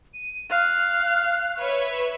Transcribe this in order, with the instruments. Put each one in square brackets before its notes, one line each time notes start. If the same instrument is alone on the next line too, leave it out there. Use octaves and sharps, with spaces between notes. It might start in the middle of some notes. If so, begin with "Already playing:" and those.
[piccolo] D#7
[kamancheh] F5 [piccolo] F#6
[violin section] B4 C#5 E5